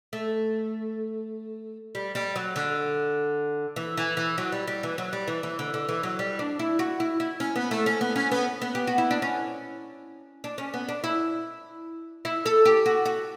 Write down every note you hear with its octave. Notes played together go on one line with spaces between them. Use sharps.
A3
G3
G3
F#3
D3
E3
E3
E3
F#3
G3
G3
E3
F#3
G3
E3
E3
D3
D3
E3
F#3
G3
D4
E4
F#4
E4
E4
C#4
B3
A3
C#4
B3
C#4
B3
B3
G4
F#4
E4
D4
C#4
D4
C#4
B3
D4
E4
E4
A4
G4
F#4
F#4